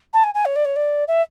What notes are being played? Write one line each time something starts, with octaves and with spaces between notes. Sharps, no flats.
A5
G#5
G#5
C#5
D5
C#5
D5
E5